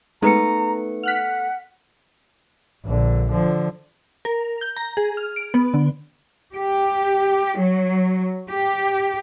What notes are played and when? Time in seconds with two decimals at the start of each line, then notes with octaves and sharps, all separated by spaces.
0.22 G#3 A3 B3 D#4 B4 A#5 C#7
1.03 F#5 F6 F#6 B6
2.85 A#1 D3
3.31 D3 F3
4.25 A#4
4.61 G6
4.77 A#5
4.97 G#4
5.17 F6
5.36 D7
5.54 B3
5.74 D3
6.53 G4
7.57 F#3
8.48 G4